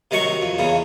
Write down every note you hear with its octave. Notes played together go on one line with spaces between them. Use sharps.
C3 D#3 F#3 C#6
F2
E2 C#3